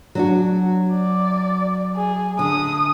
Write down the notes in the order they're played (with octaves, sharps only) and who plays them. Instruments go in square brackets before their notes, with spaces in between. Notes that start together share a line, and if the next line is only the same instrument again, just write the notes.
[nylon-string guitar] F#3 D4 F#4
[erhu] D5
G#4
[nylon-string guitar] D3 [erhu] D#6